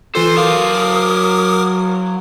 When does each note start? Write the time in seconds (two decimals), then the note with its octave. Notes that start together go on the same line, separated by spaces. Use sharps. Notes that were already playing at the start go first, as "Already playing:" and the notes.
0.15 E3 F4 A4 C5
0.37 F#3 A#4 F5 D6 D#6